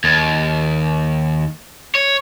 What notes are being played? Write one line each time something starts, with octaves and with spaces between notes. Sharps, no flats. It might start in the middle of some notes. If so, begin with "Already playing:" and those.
D#2
C#5